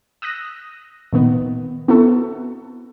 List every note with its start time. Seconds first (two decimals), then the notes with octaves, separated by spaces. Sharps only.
0.22 D#6 E6 F#6 A#6
1.13 A#2 D#3 B3
1.88 B3 C4 E4 F#4 A4